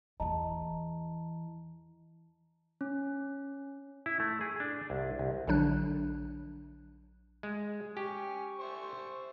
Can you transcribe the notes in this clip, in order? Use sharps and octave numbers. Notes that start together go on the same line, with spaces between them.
E2 E3 D#5 A5 A#5
C#4
E4
A3
G#4
D4
C2
C2
A#1 D3 F#3 D4 F#6
G#3
G4 G#5 C#6
C5 E5 C#6